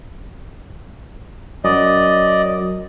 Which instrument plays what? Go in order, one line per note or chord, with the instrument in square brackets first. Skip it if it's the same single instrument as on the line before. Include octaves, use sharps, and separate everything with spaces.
[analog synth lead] F#2 [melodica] D5 D#5